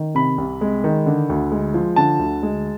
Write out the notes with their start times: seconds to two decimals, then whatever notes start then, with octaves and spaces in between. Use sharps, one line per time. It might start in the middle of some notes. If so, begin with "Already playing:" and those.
Already playing: D#3
0.15 C3 B5
0.38 C2
0.61 G#3
0.84 D#3
1.06 D3
1.29 D2
1.52 G#3
1.74 F3
1.96 D3 A5
2.19 D2
2.43 G#3